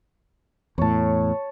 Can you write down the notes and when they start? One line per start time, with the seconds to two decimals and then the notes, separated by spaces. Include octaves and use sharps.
0.78 E2 A2 C#5 A5